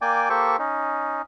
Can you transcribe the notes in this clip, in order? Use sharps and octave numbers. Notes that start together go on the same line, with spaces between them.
A#3 D5 G5 G#5 D6
A#3 G4 A4 C5 C#6
C#4 D#4